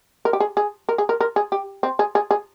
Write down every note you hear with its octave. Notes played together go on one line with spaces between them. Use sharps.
A#4
G4
G#4
G#4
A#4
G#4
A#4
A#4
G#4
G4
C4
G#4
G#4
G#4